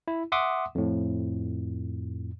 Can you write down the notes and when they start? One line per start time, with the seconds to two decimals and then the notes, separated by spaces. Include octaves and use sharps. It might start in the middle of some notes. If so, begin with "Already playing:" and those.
0.08 E4
0.32 E5 F#5 C6 D6 D#6
0.75 F2 A2